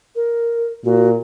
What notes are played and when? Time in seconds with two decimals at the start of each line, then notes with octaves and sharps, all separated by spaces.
0.16 A#4
0.85 A#2 F#4